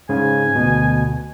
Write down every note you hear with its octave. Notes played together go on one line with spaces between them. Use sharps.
G#2 C#3 G#5
D2 B2